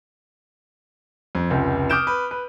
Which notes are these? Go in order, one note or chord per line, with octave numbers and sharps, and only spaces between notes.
F2
F1 C#2
D6 D#6 F6 G6 D7 E7
B4
B4